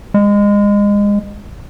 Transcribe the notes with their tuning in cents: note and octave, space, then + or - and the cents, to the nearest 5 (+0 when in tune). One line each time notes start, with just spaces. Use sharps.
G#3 -25